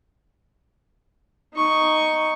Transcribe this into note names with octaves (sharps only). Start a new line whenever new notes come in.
D#4 C#6